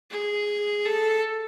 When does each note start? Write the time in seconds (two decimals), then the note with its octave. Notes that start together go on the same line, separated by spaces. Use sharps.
0.11 G#4
0.85 A4